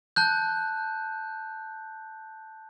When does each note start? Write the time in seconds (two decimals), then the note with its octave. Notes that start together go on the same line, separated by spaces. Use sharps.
0.16 A5 F#6 G6